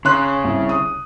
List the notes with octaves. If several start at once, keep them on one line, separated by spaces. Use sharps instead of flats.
C#3 C#5 C6 F#6
C2
D#6